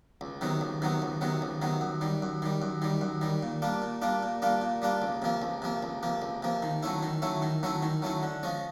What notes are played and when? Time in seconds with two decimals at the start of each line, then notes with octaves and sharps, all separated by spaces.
0.21 C#2
0.41 C3 D#3 F#3 B3
0.61 C#2
0.82 C3 D#3 F#3 B3
1.02 C#2
1.21 C3 D#3 F#3 B3
1.42 C#2
1.62 C3 D#3 F#3 B3
1.81 F#2
2.01 D#3 G3
2.22 F#2
2.42 D#3 G3
2.62 F#2
2.82 D#3 G3
3.01 F#2
3.21 D#3 G3
3.43 A#2
3.62 G3 A#3 D4 F4
3.82 A#2
4.02 G3 A#3 D4 F4
4.23 A#2
4.42 G3 A#3 D4 F4
4.62 A#2
4.82 G3 A#3 D4 F4
5.02 C#2
5.22 C3 F3 A#3
5.42 C#2
5.62 C3 F3 A#3
5.83 C#2
6.03 C3 F3 A#3
6.22 C#2
6.43 C3 F3 A#3
6.63 D#3
6.83 F#3 A3 C#4 E4
7.03 D#3
7.22 F#3 A3 C#4 E4
7.42 D#3
7.63 F#3 A3 C#4 E4
7.83 D#3
8.02 F#3 A3 C#4 E4
8.23 D3
8.43 F3 G#3 C#4